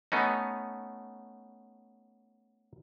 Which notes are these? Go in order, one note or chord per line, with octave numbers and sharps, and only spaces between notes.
A3 B3 C#4 D#4